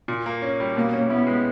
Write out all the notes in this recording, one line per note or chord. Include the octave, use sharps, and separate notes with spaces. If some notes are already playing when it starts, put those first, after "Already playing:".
A#2
A#3
C#4
G3
B2 A#3
C#4
B3 E4
G#3